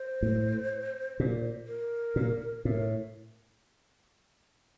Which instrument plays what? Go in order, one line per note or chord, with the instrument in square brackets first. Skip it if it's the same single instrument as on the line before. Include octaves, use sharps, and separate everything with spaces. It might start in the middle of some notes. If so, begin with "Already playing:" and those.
Already playing: [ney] C5
[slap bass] A2
A#2
[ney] A#4
[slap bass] A#2
[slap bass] A2 [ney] A#4